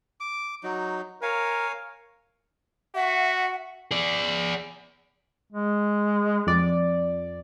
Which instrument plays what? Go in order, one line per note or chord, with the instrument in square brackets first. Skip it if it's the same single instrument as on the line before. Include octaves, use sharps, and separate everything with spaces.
[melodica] D6
F#3 D#4
[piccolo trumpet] A#4 [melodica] C#5 F5 G#5
[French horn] F#4 [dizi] E5 [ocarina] F#5
[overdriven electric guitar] G#4 D5
[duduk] G#3
[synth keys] F2 D5